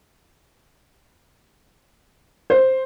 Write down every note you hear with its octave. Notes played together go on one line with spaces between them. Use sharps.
C5